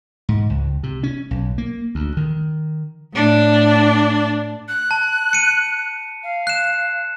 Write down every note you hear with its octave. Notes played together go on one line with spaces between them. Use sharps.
G#2
C#2
C3
C#4
B1
A#3
D2
D#3
A2 D4
F#6
A5
C#7 D#7
F5
F#6 E7